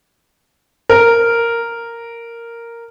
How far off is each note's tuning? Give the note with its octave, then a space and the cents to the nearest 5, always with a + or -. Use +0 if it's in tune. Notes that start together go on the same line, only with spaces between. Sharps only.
A#4 -5